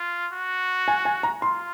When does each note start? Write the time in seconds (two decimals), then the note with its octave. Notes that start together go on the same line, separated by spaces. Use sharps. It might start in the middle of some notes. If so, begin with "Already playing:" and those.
Already playing: F4
0.33 F#4
0.88 G#5
1.05 G#5
1.23 A#5
1.42 F4 C6